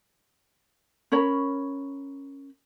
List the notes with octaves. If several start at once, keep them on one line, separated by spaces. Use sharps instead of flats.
C#4 A#4 C#5 B5